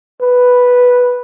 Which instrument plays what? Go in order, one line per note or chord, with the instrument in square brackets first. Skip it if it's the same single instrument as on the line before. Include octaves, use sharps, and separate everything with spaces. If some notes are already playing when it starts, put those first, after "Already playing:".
[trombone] B4